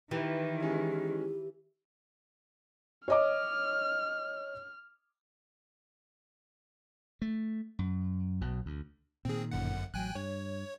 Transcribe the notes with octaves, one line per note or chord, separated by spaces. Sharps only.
D#3 E3 G4 A#4 B4
G#3 C#4 E4 G4
C#5 D#5 D6 F6
A3
F#2
B1 B2
D2
A#2 D#3 C4 G#4
G1 F#2 F#5
A1 F#3 G5 G#5 F#6
G2 C#5